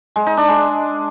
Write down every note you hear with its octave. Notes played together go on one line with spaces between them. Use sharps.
G#3
D#4
D4
G#3